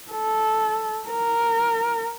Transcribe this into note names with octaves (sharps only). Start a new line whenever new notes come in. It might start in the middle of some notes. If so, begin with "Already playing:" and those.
A4
A#4